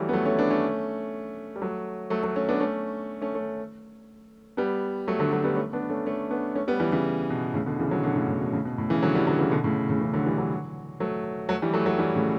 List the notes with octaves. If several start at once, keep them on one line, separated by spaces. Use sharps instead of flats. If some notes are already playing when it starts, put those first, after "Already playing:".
Already playing: E3 F#3 G3 A3
B3
F#3 A3
A3 C#4
B3 D4
A3 C#4
G3
F#3 A3
F#3 A3
F#3 A3
A3 C#4
B3 D4
A3 C#4
A3 C#4
A3 C#4
G3 B3
F#3 A3
D3 F#3
F#3 A3
G3 B3
A3 C#4
B3 D4
A3 C#4
A3 C#4
B3 D4
A3 C#4
G3 B3
E3 G3
C#3 E3
B2
A2 C#3
B2 D3
C#3 E3
D3 F#3
B2 D3
A2 C#3
A2
B2
A2 C#3
B2
A2
C#3 E3
D3 F#3
E3 G3
D3 F#3
C#3 E3
B2 D3
A2 C#3
A2 C#3
C#3 E3
D3 F#3
E3 G3
D3 F#3
F#3 A3
F#3 A3
E3 G3
F#3 A3
F#3 A3
E3 G3
A2 C#3